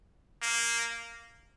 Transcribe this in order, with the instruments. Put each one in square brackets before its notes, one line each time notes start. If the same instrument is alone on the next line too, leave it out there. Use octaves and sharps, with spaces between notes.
[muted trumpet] A#3